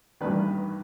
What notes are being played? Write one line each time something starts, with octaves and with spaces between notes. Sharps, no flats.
A1 G2 D#3 B4